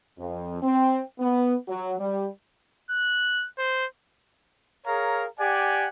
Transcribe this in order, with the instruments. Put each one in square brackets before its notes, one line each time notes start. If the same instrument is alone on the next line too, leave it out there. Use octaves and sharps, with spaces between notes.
[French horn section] F2
C4
B3
F#3
G3
[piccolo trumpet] F#6
C5
[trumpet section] G#4 A#4 C#5 F5 A#5
G4 D5 F#5 G#5